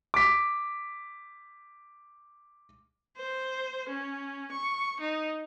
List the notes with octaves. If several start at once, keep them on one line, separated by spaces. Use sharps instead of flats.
D6 B6
C5
C#4
C#6
D#4